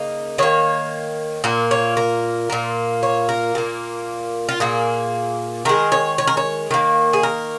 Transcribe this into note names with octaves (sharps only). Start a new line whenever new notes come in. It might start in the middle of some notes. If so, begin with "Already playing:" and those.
Already playing: C#3 A#3 D#4
D#3 A#3 C#5
A#2 A#3
C#5
A#4
A#2 A#3
C#5
A#4
A#2 A#3
F4
A#2 A#3 G#4
D#3 G#3 A#4
C#5
C#5
A#4
C#5
D#3 A#3
G#4
A#4